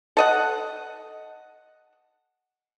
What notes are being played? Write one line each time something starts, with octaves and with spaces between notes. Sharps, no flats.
A4 D#5 F#5